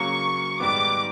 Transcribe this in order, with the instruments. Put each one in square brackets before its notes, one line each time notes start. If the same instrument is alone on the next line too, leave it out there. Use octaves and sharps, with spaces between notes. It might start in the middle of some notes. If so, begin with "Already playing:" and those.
Already playing: [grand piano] C#3 F#3 A#3 [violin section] C#6
[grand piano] G#2 D#3 G3 B3 [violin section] D6